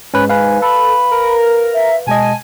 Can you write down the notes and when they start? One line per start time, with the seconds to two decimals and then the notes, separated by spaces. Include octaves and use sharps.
0.14 G#2 C#4 B4
0.29 B4 F5 G#5
0.62 A4 B5
1.11 A#4
1.74 E5
2.07 B2 G#3 D#5 G#5 A5